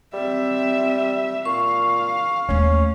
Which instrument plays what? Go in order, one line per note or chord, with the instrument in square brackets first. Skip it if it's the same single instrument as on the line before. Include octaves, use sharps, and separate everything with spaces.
[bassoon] G3 [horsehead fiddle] C4 E5
[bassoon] A#2 [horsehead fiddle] F5 [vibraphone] C#6
[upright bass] D#2 A3 [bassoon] C#4